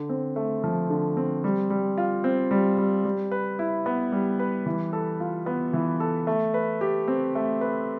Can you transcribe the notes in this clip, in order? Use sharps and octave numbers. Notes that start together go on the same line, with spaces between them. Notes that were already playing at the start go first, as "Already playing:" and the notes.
Already playing: D3
C4
A3
F3
D3
C4
G3
G3
F4
C4
G3
G3
G3
B4
E4
B3
G3
B4
E3
A4
F4
B3
E3
A4
A3
B4
G4
C4
A3
B4